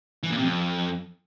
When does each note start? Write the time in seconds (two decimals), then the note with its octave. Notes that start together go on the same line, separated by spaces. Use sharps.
0.23 E3
0.30 A#2
0.37 C3
0.44 F2